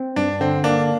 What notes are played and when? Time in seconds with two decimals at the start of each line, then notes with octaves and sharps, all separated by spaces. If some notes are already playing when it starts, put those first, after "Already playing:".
Already playing: C4
0.16 G2 D4
0.40 D3 C4
0.64 A#3 D4